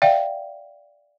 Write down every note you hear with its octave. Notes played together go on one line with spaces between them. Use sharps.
D5 E5 F5 G5